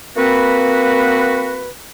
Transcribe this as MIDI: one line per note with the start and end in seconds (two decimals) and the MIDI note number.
0.17 1.69 58
0.17 1.69 60
0.17 1.69 66
0.17 1.69 71